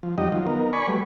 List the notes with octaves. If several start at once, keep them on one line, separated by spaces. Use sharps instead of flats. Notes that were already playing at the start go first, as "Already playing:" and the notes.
F3
F2 F#3 G3 D#4 G4 D#5
D#3 F#3 F4
B3 D#4 A#4
D5 G#5 B5 C#6
F#3 G3 A3 B4